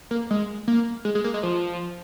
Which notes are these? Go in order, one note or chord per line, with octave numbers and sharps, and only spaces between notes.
A#3
G#3
A#3
G#3
G#3
A#3
G#3
F3